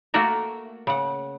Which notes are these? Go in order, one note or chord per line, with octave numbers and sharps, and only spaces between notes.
A3 A#3 F#4 A4 A#4
C#3 F#5